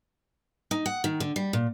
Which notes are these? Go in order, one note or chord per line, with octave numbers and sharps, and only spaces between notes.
D#4
F#5
D#3
D3
G3
A#2